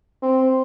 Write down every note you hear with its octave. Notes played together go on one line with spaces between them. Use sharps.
C4